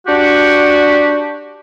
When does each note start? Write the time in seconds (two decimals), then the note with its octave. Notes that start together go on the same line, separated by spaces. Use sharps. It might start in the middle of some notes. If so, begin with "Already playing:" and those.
0.07 D4 F#4 G4